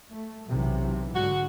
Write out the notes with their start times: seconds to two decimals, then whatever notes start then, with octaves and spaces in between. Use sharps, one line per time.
0.12 A3
0.50 B1 C3 E3
1.14 G#2 D3 F#4